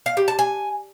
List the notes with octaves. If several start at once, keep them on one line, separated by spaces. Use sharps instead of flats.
F5
G4
A5
G#5